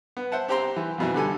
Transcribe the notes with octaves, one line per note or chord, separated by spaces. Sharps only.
B3
C5 E5 F#5 A5
C4 G4 C5 G5 A#5 C6
E3
F2 B2 E3
D3 G3 A4 G#5